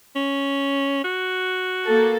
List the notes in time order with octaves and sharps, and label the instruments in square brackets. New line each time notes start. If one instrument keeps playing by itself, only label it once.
[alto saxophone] C#4
F#4
[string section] A#3 A4